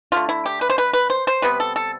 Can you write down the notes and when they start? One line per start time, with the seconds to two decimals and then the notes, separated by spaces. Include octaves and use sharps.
0.12 D3 A3 F4
0.29 E4
0.46 G4
0.61 B4
0.70 C5
0.78 B4
0.93 B4
1.10 C5
1.27 C5
1.42 C3 G3 B3 B4
1.60 A4
1.76 A4